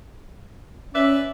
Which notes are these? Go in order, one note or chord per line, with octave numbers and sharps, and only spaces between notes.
C#4 B4 D5 E5